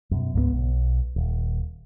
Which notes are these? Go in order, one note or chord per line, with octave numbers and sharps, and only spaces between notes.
F#2 B2
C#2 G#2 G#3 B3
B1
D#1